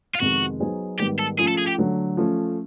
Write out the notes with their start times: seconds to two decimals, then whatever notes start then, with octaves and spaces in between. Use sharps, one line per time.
0.15 F4
0.21 F2 C3 D#3 G#3 B3 F#4
0.60 F#3 B3 D#4 G#4 C5
0.99 G#2 D#3 G3 B3 G4
1.19 A4
1.38 F3 A3 C#4 F4 G#4
1.48 A4
1.59 G#4
1.68 G4
1.78 D3 F#3 A3
2.17 F3 A3 C#4